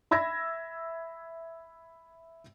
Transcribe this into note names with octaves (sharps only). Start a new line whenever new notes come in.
E5 B5 E6 G#6 A#6